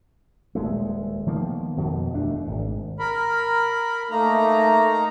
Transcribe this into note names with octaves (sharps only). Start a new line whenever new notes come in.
D#1 G#3 A3
D#3 F3 A#3 B3
F2 B2 D#3
E1 D#2 A3 D4
G#1
A#4 B5
A3 A#3 D#4 A#5